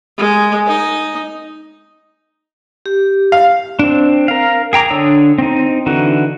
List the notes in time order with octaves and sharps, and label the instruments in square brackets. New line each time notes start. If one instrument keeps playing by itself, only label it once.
[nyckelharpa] G#3
D#4
[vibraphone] G4
[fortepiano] F5
[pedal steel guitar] C4 D4
A#4 F5
G#4 G5 A#5 D6
D3 D4 C#5 D#6 E6
C4 D#4
D3 E3 D#4 F#4